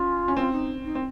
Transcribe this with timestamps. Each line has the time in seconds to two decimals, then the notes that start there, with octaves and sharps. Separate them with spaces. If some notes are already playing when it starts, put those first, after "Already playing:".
Already playing: C#4 F4
0.28 C#4
0.37 C4 F4
0.51 D#4
0.83 D#4
0.95 C4